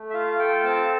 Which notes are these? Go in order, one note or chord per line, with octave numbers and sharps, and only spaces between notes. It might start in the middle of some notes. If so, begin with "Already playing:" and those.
Already playing: A3
E5
F4 F5
A4 G5
C4 A5